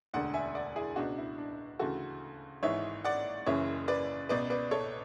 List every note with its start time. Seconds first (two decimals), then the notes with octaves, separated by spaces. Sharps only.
0.14 E1 D2 D3 D5 F#5
0.34 E5 G#5
0.55 D5 F#5
0.76 E4 G#4
0.96 C#2 B2 D4 F#4
1.18 E4
1.38 D4
1.79 D2 C#3 E3 F#4 A4
2.63 G#1 G#2 E3 C#5 E5
3.05 D5 F#5
3.46 F#1 F#2 C#3 E3 C#5 E5
3.88 B4 D5
4.29 C#2 B2 B4 D5
4.50 B4 D5
4.71 A4 C#5